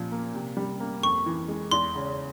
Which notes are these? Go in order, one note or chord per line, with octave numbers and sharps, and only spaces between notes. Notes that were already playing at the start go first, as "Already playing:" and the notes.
Already playing: A#2 F3
A#3
C3
G3
A#3
F2 C#6
E3
G#3
E2 C6
C#3